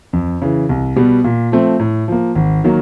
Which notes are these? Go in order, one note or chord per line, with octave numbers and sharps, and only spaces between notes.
F2
C#3 E3
C2
B2 G3 B3
A#2
F3 A3 C4
A2
F3 A#3
G#1
D#3 F#3 A#3